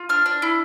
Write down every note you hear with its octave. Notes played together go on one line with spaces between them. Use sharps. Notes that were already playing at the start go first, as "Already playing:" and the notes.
Already playing: F4
D4 F6
D4
E4